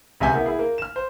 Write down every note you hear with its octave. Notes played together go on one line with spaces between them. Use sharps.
C#2 C3 D#5 E5 G#5 G6
A#3 B3 E4
E4 G#4
A#3
F6 E7
C5